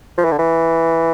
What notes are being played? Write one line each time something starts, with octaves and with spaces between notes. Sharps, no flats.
F3
E3
D3
E3